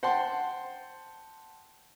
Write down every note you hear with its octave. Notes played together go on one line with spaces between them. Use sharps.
C5 F#5 G5 A5 C6